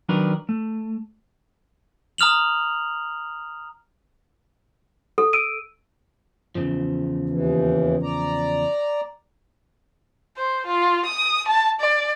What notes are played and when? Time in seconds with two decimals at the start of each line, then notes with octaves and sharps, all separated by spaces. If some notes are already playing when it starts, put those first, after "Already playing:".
0.09 D#3 F#3 D4 A#4 B4 D5
0.49 A3
2.18 A#5 D#6 F6 F7 F#7
5.18 A4
5.33 E6 D7 D#7
6.55 E2 C#3 F3
7.30 D#2 E3
8.03 D5 A#5
10.37 C5
10.66 F4
11.06 D#6
11.48 A5
11.80 D5